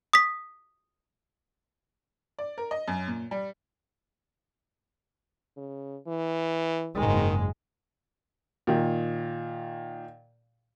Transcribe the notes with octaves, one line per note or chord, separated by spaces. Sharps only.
D#6 B6
D5
A#4
D#5
F#2
A#2
G3
C#3
E3
F#1 G#2 D#3 G#3
A#2 D#3